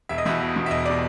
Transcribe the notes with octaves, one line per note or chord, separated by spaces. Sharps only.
E1 E5
D#5
E2 B2 E5
E1
E2 B2
E5
E1 D#5
B2 D5